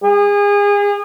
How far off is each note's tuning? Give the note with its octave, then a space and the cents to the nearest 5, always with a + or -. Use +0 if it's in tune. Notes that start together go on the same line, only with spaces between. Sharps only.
G#4 -30